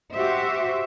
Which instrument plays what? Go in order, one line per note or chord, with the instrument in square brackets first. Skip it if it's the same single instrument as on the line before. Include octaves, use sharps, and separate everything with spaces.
[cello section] F#4 G4 C5 E5